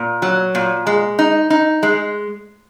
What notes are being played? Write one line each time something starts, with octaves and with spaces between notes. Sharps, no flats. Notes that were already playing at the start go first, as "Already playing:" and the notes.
Already playing: A#2
F#3
A#2
G#3
D#4
D#4
G#3